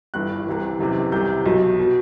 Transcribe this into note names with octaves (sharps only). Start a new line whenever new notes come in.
G1 G2 E3 F#6
C2 C3 E3
F#1 E2 C3 E3
C2 C3 E3 G6
B1 B2
B2